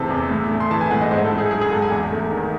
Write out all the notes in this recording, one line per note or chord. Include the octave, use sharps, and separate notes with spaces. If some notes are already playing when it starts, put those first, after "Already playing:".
Already playing: E2 C3 E3 A3 G#4 A4 C5 A5
E2
A2
A3
C6
E3 A5
G#5
A2 F#5
D#5
G#2 C5
A4
A3
G#4
F#3 G#4
G#4
G#2 A4
G#5
E2
A3
D#3